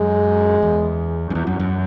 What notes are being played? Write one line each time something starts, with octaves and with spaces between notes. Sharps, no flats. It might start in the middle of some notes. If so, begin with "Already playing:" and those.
Already playing: F#2 G#3
E2
F#2
E2
F#2
F#2